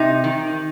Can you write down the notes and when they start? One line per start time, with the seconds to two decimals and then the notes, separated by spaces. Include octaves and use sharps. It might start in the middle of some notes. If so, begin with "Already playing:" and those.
Already playing: C3 D#4
0.24 D#3